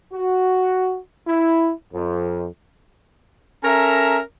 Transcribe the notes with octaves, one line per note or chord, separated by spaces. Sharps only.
F#4
E4
F2
C#4 A4 A#4 E5 A#5